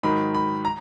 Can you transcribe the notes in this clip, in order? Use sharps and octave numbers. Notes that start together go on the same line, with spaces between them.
G#2 D#3 F#3 B5
B5
A#5